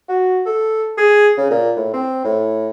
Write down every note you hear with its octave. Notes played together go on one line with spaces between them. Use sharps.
F#4
A4
G#4
C#3
A#2
A2
C4
A2